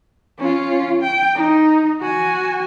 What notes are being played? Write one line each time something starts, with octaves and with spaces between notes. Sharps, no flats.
C#4 F4
G5
D#4
F#4 G#5